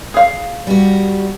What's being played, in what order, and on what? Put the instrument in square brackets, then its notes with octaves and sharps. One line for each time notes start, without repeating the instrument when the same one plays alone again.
[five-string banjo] G#4 F5
[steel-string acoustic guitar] G3 F#4